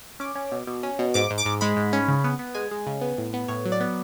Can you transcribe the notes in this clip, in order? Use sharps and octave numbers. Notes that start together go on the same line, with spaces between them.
C#4 D6
C#4
B2
B2
C#4
B2
G#2 D6
G#2
D6
G#2
G#3 B5
G#2
C#4
C#3
B3
B3
G#3 G#5
G#3
C#3
B3
A2
B3
A2 C#5
F#3
D5
B3